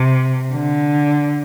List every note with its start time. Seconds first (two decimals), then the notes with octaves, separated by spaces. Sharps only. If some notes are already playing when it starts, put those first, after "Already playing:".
Already playing: C3
0.53 D3